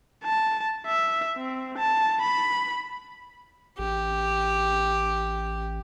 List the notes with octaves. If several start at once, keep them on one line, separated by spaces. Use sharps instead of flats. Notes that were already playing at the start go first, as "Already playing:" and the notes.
A5
E5
C4
A5
B5
A1 G4